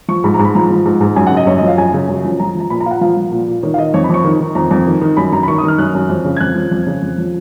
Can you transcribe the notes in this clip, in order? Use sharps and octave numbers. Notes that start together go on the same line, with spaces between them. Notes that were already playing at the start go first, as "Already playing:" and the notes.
F3 C#6
G#2 B5
A#5
G#2
B5
F3 A#5
F3
G#2
G#2
F#2 G#5
F#5
C#3
D#5
F#2 C#5
D#5
F3
F5
F#2 G#5
C#3
F#2
F3
F3 A#5
F3 A#5
A#2 B5
A#5
A#2 F5
F#5
F3 F5
F3
A#2
A#2
D#3 C#5
F5
D#3 D#5
F2 C#5
B5
F2 C#6
D#3
D#3
F2 A#5
F2
D#3
D#3
F#2 B5
F#2 A#5
B5
D#3 C#6
D#6
D#3 F6
F#2 F#6
F#2
F2
C#3
G#6
F2 F#6
F3
F2
C#3
F2
F3